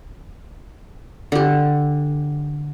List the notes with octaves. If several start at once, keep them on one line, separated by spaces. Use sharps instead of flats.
D3 G4